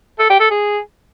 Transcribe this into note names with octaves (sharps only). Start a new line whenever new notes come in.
A4
G4
A4
G#4